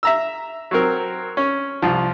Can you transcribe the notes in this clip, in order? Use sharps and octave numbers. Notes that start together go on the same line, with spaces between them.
E5 A#5 E6
F#3 C4 A#4
C#4
C2 F3